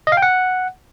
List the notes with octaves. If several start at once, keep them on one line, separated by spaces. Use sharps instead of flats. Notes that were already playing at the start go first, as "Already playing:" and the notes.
D#5
F5
G5
F#5